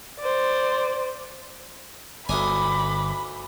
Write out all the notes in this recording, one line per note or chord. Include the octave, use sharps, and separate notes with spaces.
C5 D5
G1 D2 D#4 G#5 B5 D6